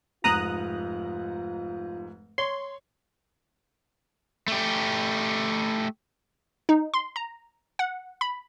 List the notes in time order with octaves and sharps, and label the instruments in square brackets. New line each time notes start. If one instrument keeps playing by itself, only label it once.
[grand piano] F1 G#2 A#6 [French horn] F4 [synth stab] A#5 D#6 F#6
[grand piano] C#5 [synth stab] C6
[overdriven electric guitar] A3 G4
[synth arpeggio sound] D#4
C6
A#5
F#5
B5